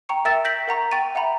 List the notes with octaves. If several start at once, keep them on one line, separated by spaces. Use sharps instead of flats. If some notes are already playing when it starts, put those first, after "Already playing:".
G5 A#5 C#6 C#7
A#4 E5 G5 E6 A6 E7
G6 A#6 B6 D7 F#7
A#4 F#5 A#5 C#6
G5 C#6 A6 D#7
E5 F#5 G5 A#5 B5